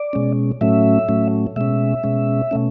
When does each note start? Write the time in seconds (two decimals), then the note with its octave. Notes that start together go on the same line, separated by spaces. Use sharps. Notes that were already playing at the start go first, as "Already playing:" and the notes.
Already playing: D5
0.13 B2 G#3 C#4
0.61 A2 F#3 A3 C#4 E5
1.09 A2 F#3 A3 C#4
1.56 B2 G#3 C#4 E5
2.04 B2 G#3 C#4
2.51 B2 A3 C#4